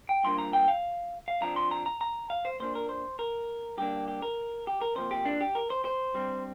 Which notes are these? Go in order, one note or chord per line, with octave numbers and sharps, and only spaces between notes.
G5
G2 F3 A#3 D4 C6
A#5
G5
F5
F5
F2 F3 D4 A#5
C6
A#5
A#5
A#5
F5
C5
A#2 A#3 D4 C5
A#4
C5
A#4
G2 D3 A#3 D4 G4
G4
A#4
G4
A#4
C3 F3 A#3 C5
G4
D4
G4
A#4
C5
C5
G2 G3 C4